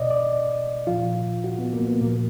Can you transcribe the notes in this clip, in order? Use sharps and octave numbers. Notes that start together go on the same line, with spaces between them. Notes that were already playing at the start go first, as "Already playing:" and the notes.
Already playing: B2 D5 D#5
D5
A#2 F3 F4
F#4
B3
A#3
B3
A#2 F3 A#3